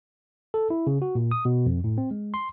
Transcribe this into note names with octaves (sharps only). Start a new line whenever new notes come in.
A4
E4
C#3
F#4
A#2
D#6
B2
F2
A2
C4
G#3
C6